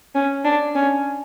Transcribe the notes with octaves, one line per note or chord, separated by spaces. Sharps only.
C#4
D4
C#4